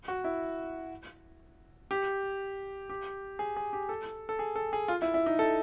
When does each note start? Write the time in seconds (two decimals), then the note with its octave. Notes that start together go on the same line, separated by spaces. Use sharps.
0.08 F#4
0.24 E4
1.91 G4
2.90 G4
3.39 G#4
3.57 G#4
3.73 G4
3.89 A4
4.29 A4
4.39 G#4
4.56 A4
4.73 G#4
4.88 F4
5.02 E4
5.14 E4
5.26 D#4
5.39 A4